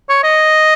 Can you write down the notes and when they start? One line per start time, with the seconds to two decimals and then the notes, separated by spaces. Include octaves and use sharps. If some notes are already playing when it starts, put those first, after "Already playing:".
0.10 C#5
0.24 D#5